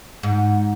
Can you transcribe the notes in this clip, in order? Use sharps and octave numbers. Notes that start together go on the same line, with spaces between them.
G#2